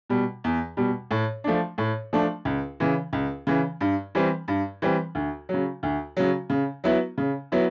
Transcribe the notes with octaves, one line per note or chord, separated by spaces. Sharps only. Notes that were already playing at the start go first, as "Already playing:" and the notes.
B2 G3
E2
B2 G3
A2
F3 A3 D4
A2
F3 A3 D4
C#2
C#3 E3
C#2
C#3 E3
G2
E3 G3 C4
G2
E3 G3 C4
D2
C#3 F#3
D2
C#3 F#3
C#3
F#3 B3 E4
C#3
F#3 B3 E4